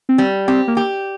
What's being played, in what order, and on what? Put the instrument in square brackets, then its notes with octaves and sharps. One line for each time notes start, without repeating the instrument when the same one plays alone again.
[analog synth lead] C4
[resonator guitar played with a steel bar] G3
[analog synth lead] C4 [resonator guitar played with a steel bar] G4
[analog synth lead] A#3
[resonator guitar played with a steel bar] G4